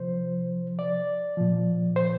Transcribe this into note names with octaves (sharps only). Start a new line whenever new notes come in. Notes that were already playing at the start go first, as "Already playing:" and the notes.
Already playing: C3 F3 C5
D5
A#2 F3
C5